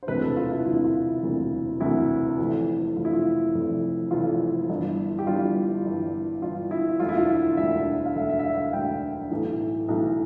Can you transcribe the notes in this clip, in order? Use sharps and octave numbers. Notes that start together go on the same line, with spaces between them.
C5
E1 D2 C3 E3 B4
A4
F4
E4
E1 D2 C3 E3 F4
E4
F4
E1 D2 C3 E3
E1 D2 C3 E3 E4
F1 F2 E3
F1 F2 E3 F4
E4
F4
F1 F2 E3
F1 F2 E3 F4
G1 G2 E3
G4
G1 G2 E3 F4
G1 G2 E3
G1 G2 E3 F4
E4
E1 D2 D3 F4
E4
F4
E1 D2 D3 E5
F5
E1 D2 D3 E5
E5
E5
F5
F5
E1 D2 D3 G5
B1 A2 E3
B1 A2 E3